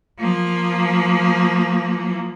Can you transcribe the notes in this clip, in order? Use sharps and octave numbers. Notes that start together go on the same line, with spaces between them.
F3 A#3